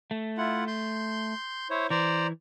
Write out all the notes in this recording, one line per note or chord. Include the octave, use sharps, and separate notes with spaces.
A3
E4 F4 F#5
C6 G6
E4 C5 C#5
E3 C5 D5 A#5